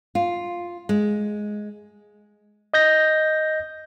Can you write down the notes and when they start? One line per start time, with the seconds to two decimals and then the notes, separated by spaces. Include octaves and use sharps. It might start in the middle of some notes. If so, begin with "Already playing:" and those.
0.15 F4
0.89 G#3
2.74 D#5 G6 A#6